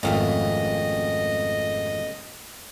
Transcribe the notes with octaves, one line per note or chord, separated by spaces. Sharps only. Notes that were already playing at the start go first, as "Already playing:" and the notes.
G#1 F2 C#3 A3 B3 D#5 F5